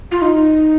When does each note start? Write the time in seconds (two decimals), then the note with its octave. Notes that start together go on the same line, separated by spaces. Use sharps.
0.11 F4
0.22 D#4